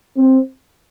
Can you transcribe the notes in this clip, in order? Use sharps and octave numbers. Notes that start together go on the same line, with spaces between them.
C4